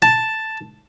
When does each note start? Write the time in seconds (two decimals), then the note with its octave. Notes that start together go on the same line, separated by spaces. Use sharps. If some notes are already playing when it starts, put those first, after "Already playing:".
0.02 A5